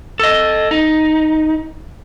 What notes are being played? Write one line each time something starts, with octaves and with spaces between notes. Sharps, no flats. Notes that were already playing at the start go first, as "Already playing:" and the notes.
A4 D#5
D#4